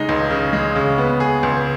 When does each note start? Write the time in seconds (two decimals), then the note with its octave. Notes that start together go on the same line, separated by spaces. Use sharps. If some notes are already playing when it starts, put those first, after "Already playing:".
Already playing: C#3 G#3 D#4
0.09 C#2
0.31 C#3
0.53 G#3
0.76 C#3
0.98 B3
1.20 G#4
1.43 C#2